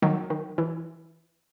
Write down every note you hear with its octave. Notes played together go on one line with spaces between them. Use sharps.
D#3 F#3
D#3
E3